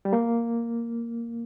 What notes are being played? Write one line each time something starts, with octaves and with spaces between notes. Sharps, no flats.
G3
A#3